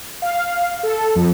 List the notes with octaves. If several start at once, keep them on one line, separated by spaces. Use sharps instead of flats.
F5
A4
F2